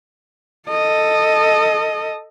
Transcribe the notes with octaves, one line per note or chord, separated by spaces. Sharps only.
A4 D#5